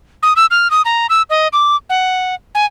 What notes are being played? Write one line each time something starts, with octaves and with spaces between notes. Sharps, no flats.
D#6
E6
F6
D#6
A#5
E6
D#5
D6
F#5
G#5